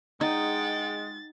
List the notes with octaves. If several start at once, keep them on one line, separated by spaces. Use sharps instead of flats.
G#3 D#4 F#5 G5 A6